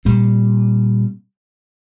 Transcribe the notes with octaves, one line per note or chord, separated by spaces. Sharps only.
A#2 G3 C4